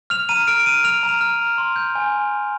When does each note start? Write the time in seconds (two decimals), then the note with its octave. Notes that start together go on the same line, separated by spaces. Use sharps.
0.10 F6 F7
0.29 A#5 D#7
0.47 F6 D7
0.65 F6 D#7
0.84 F6 F7
1.03 A#5
1.09 F7
1.21 F6
1.40 A#5
1.58 C6
1.76 G6
1.95 G#5